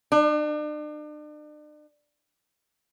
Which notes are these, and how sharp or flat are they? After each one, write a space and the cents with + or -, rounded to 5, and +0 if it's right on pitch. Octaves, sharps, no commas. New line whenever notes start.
D4 +40